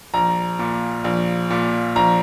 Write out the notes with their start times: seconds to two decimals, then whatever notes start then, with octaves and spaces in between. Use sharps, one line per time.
0.14 A#1 A#5
0.59 A#2
1.04 A#1
1.50 A#2
1.96 A#1 A#5